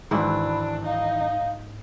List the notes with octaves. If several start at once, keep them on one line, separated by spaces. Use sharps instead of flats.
G#2 D#3 E3 F#3 D4 E4 B5
D#4 F5